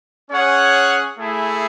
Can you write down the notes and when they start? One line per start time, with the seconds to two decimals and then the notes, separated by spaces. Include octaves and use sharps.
0.29 C#4 G#4 C#5 F#5
1.17 A3 E4 G#4